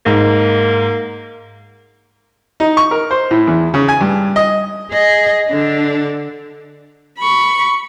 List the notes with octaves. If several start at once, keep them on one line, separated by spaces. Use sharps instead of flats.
G#2 A#3
D#4
C#6
A#4
C5
A2
E2
C#3
G#5
G2
D#5
G#4 D#5
D3 D4
B5 C#6